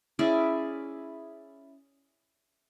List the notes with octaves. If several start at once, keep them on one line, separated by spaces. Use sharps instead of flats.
C#4 E4 G#4 D5